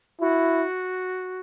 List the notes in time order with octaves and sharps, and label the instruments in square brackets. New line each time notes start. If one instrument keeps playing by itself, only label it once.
[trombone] E4 [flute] F#4